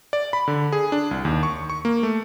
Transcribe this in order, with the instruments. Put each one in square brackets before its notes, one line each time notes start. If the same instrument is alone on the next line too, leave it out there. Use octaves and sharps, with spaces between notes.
[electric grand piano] D5
B5
D3
G#4
D4
C2
D#2
C#6
C#6
A#3
A3